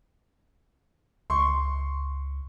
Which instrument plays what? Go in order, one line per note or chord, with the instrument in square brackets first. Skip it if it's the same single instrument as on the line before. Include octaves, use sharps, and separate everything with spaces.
[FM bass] C#2 [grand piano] C6 C#6